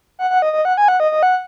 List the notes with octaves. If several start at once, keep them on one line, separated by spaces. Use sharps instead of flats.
F#5
F#5
D#5
D#5
F#5
G#5
F#5
D#5
D#5
F#5